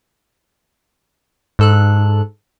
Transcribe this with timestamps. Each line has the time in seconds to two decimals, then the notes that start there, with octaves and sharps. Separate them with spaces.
1.59 G#2 A4 F#6